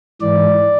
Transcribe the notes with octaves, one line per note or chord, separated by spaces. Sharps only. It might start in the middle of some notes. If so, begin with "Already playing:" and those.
G#2 E3 D5